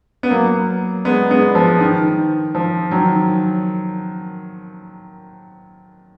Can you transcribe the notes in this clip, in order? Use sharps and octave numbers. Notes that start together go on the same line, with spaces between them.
B3
F#3 A#3
G#3 B3
G#3 B3
F3
D#3
F3
D#3 F#3